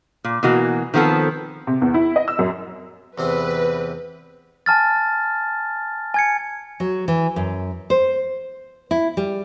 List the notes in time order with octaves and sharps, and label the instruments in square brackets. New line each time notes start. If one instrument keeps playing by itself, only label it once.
[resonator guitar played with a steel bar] A#2
B2 E3 A#3 F#4
D#3 F3 B3 C4 A4
[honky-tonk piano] C3
E2
E4
D#5
E6
F#2
[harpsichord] E2 C3 C4 [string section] B4
[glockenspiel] G#5 A5 F6 A6
G#5 G#6 C#7
[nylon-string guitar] F#3
E3
F#2
C5
E4
G3